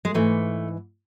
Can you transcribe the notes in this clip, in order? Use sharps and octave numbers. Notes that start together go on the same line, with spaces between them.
G#3
G#2 E3 A3